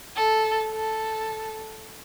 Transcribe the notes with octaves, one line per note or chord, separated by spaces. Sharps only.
A4
A4